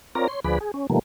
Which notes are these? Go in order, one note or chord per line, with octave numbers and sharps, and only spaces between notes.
C4 F4 A#4 C#5 D5 A#5
C#5 C6
D2 F3 G#4 B4 D5 B5
G#4
C#4
B2 D#3 F3 G3 A3 A#3